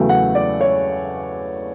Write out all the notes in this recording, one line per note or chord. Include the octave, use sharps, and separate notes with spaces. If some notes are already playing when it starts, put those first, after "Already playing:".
Already playing: E2 C#3 F#3 A3 G5
F#5
D5
C#5